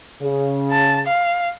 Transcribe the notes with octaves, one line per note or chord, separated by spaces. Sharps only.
C#3
A5
F5